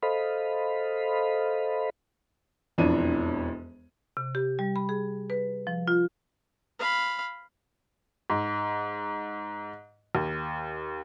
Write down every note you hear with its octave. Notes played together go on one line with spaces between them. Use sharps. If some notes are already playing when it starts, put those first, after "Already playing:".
A4 C5 D#5 F5 B5
E1 F2 E3 D4 C#5 D#7
C3
G4
G3
B5
G#4
B4
F3
F4
F5 B5
G#2
D#2